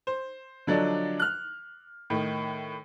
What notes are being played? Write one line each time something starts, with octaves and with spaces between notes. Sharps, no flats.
C5
D3 F3 F#3 D4 D#4 D5
F6 F#6
A2 D#3